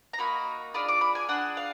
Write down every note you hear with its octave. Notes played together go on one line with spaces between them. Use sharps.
A#5
A#3 D#4 F#4 B5
D4 F4 G#4 B5
D6
B5
G#5
D4 G#4 F#5
F5